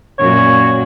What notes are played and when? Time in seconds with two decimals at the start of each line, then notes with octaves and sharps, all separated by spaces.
0.19 F#2 A#2 F#4 C#5